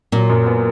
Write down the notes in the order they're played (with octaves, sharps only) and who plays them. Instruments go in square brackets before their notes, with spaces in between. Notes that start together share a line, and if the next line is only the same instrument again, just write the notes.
[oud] A#2 [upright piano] F#3
[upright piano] F#2
B3